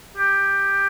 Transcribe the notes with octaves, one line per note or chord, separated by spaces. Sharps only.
G4